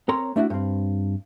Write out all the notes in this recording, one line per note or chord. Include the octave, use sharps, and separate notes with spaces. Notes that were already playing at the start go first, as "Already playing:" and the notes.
C4 A#4 C#5 A#5 C6
A3 D4 E4 F#4
G2 C4